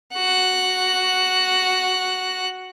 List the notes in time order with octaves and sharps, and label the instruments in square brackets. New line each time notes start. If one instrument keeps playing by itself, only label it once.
[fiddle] F#4 F#6